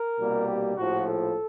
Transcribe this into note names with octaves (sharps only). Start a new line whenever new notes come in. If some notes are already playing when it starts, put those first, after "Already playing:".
Already playing: A#4
C2 B2 G3 A#3
G4
A#1 A2 F3 F#4
A4